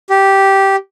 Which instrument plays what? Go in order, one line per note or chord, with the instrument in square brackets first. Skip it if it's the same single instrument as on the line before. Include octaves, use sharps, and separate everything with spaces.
[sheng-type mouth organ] G4